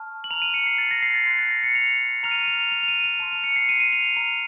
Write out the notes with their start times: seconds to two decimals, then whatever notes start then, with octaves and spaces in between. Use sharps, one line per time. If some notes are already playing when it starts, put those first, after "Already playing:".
Already playing: A5 C#6 F6
0.24 F#7
0.31 A#5 F6 F7
0.42 D#7
0.54 C#7
0.66 C7
0.78 A6
0.91 A#6
1.02 C7
1.15 A6
1.26 C6 F#6 A6
1.39 A6
1.51 A#6
1.63 C#7
1.75 F7
2.23 A#5 C#6 F6 F7
2.31 D#7
2.36 F7
2.48 F7
2.60 F7
2.72 F7
2.83 F7
2.88 D#7
3.04 F7
3.19 A5 C6 F6 F7
3.32 F7
3.44 C#7
3.56 C7
3.69 D#7
3.80 D#7
3.92 F7
4.05 F7
4.17 A#5 F6 F7